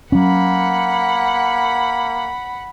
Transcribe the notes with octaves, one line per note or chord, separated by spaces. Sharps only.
F#3 A#3 C#4 F#5 B5